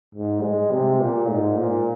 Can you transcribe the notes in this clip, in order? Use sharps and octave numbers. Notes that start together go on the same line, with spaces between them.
G#2
G#3
C3
A#2
G#2
A#2